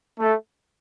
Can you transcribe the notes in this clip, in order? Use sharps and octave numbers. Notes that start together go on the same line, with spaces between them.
A3